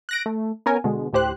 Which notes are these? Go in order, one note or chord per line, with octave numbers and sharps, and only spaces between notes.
F#6 A#6 D7
A3
B3 C#4 A#4 G#5
B2 D3 G#3
D2 A2 G4 C5 F#6